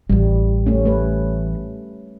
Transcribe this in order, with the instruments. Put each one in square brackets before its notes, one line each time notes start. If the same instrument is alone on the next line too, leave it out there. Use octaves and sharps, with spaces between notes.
[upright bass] A1 E3 [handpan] G3
[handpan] A3 C#4
A3 B4